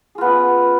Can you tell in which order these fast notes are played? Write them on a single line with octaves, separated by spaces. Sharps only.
G#4 F4 B3 C#4